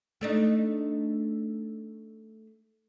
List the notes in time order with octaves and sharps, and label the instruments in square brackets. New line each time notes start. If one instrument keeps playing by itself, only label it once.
[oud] A3 D4 D#4